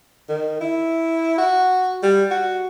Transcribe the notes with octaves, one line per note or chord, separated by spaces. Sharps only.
D#3
E4
F#4
G3
F#4